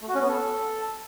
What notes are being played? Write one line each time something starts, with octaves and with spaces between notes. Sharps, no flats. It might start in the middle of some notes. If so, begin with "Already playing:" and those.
A3
F#4
C#4
B3
A4